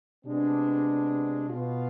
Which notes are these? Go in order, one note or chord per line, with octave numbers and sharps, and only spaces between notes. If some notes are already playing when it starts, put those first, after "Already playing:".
C3 G#3 B3 D4
B2 B3 F4